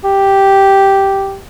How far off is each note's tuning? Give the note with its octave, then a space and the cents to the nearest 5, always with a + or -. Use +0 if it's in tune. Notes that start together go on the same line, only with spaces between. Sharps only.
G4 -5